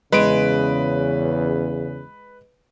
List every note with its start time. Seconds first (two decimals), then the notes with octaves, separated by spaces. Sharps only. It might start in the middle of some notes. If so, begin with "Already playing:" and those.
0.12 E2 C#3 G#3 B4 D7